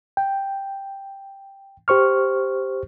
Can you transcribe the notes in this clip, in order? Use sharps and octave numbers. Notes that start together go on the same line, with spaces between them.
G5
G4 C5 C#6 F6